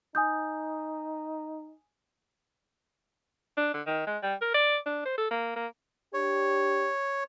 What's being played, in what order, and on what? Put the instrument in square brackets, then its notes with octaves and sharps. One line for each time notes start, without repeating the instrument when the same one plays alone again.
[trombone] D#4 [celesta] G#5 D#6 G6
[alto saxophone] D4
D3
D#3
G#3
G3
A#4
D5
D4
C5
A4
A#3
A#3
[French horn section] D4 G4 [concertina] C#5